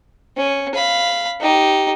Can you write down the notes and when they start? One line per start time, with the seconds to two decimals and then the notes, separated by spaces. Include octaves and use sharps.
0.37 C#4
0.74 F5 B5
1.40 D#4 G4